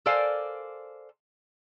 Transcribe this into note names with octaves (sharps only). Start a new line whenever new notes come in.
A4 A#4 C5 D5 F5 G#5